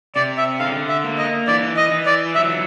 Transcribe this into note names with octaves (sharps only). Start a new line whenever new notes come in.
C3 D5
E5
D3 F5
E5
A#3
D#5
E3 D5
D#5
E3
D5
F#3 E5